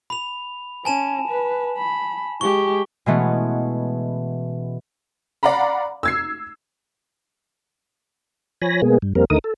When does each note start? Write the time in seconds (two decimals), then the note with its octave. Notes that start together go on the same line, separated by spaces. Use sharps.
0.10 B5 F7
0.85 C#4 G#5 A5 E7
1.28 B4
1.77 B5
2.41 G#3 G4 C#6 G7
3.06 B2 E3 G#3 A3 B3 C#4
5.43 D5 F5 F#5 A#5 B5
6.03 E6 G#6 C7
8.62 F3 C#5 G#5 B5 A#6
8.82 B2 G#3 A#3 B3 G#4
9.02 G2
9.15 F2 G3 A#3 C4 A#4
9.30 D#2 D3 A3 D#4 A#4 D#6
9.44 A4